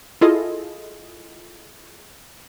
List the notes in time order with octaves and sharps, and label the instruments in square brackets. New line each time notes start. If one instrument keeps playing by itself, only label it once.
[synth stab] E4 F4 G#4 A4 D#5